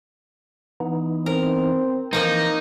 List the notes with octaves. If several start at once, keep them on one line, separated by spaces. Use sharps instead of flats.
E3 B3 D#4
C4 A#4
E3 F3 A#3 C4 D#4